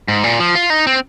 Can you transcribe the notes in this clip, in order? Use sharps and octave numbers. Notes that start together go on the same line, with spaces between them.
G#2
A#2
F3
F4
D#4
C4